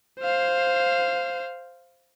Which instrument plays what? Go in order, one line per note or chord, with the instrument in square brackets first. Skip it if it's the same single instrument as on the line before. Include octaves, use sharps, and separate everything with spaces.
[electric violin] C5 F5